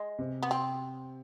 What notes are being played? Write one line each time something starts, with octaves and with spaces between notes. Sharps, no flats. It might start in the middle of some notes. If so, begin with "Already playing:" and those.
Already playing: G#3
C3
B3
C4